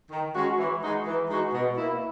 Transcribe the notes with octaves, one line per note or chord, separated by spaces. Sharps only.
D#3
G#3 C#4 F#4
E3
G#3 D#4 F#4
E3
G#3 D#4 F#4
B2
A#3 E4